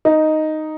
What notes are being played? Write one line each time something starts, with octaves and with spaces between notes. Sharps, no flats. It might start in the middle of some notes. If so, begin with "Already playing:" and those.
D#4